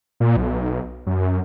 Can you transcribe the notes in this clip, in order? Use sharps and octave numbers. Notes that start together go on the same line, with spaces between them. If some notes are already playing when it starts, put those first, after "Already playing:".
A#2
B1
F#2